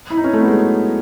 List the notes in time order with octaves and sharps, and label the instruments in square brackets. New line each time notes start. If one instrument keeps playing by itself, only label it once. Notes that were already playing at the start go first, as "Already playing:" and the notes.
[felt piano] E4
D#4
C#4
A3
B3
G#3
F#3